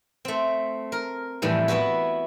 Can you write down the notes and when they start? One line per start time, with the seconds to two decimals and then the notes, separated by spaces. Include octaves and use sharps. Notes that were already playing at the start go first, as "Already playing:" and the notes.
0.25 A3 C4
0.92 A#4
1.42 F2 A2 E3 G3
1.68 B3 E4 F#4 B4